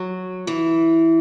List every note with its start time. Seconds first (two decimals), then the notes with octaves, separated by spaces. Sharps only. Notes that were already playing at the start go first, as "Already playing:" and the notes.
Already playing: F#3
0.47 E3